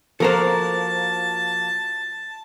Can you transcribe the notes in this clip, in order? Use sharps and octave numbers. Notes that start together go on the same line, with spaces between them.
F3 A#3 F#4 A4 A#4 C5 A5